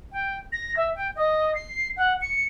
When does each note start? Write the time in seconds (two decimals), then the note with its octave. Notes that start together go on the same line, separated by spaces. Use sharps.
0.12 G5
0.52 A#6
0.77 E5
0.96 G5
1.16 D#5
1.55 C7
1.96 F#5
2.21 C#7